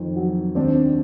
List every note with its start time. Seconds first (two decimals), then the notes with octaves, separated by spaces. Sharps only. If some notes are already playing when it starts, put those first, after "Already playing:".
Already playing: F2 D#3
0.16 F#3
0.55 D#2 C4 D4